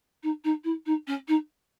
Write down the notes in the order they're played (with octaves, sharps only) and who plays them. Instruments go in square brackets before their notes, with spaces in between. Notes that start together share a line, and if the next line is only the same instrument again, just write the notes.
[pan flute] D#4
D#4
E4
D#4
C#4
D#4